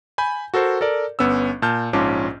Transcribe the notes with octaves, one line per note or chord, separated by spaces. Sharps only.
G#5 B5 G6
F#4 A4 A#4 C5
A4 A#4 D5
G1 B3 C#4 E6
A#2 A5 F6 G6
A#1 G#2 C#4 F4 A5 D6